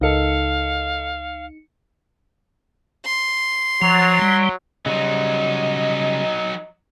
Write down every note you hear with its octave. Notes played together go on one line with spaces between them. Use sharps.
C#2 D#4 A4 A#4 D#5 F5 C#7
C6
F3 F#3
G3
C#3 F#3 G3 D#4 C5 D#5